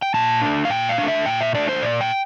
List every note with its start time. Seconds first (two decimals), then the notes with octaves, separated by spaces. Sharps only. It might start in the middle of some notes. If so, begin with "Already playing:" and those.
0.02 G5
0.14 A#2 A5
0.41 A3 D4
0.65 F5
0.70 A#2 G5
0.89 F5
0.98 A3 D4
1.08 E5
1.26 A#2 G5
1.40 E5
1.55 A3 D4 D5
1.69 C5
1.82 A#2 D5
2.01 G5